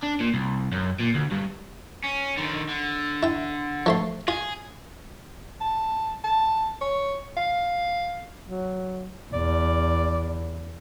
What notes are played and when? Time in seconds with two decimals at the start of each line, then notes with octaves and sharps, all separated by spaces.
0.03 D4
0.21 A#2
0.34 C2
0.72 F#2
1.00 A#2
1.15 D2
1.32 G2
2.04 C#4
2.37 D3 D#3
2.69 D3
3.23 E4 G5
3.86 F3 A3 C6
4.28 F4 G#4
5.60 A5
6.24 A5
6.81 C#5
7.37 F5
8.49 F#3
9.33 E2 D5